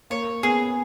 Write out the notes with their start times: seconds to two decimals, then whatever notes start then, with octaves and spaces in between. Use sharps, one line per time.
0.10 A#3 C#5
0.43 B3 G#4